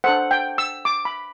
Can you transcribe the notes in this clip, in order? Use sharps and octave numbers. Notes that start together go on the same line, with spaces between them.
D4 A4 C5 F#5
G5
E6
D6
B5